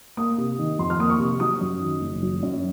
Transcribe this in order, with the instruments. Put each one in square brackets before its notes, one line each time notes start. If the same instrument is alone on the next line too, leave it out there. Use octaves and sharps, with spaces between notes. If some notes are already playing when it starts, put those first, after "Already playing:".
[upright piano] A#3 D#6
C3
D#3
F2 C6
F6
A#3 D#6
C#6
C3
F#3 D#6
F#2
D#3
F#1
F#3
F#2